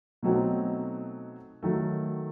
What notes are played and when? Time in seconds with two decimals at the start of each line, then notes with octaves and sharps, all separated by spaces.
0.23 B2 F#3 A3 C4 D#4
1.63 D#3 F#3 A3